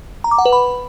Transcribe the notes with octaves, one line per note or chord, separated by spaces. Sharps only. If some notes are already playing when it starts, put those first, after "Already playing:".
A#5
D6
F#5
B4
B5